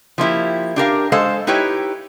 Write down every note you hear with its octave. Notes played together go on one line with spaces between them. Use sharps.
F3 A#3 E4 G4
D4 G4 A#4 F5
G#3 A4 C5 F5
D#4 E4 G4 B4 C#5